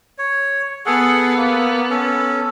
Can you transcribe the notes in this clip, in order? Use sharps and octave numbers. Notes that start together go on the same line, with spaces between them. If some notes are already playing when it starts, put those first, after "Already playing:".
C#5
B3 G#4 A4 F#5
A#3
C#4 A4